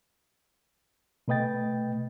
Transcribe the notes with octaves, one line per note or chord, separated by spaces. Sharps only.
B2 A3 B4 D#5 G5 A6